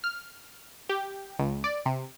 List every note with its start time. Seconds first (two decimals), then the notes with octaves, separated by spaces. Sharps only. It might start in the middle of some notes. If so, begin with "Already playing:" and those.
0.04 F6
0.89 G4
1.39 C#2
1.64 D5
1.86 C3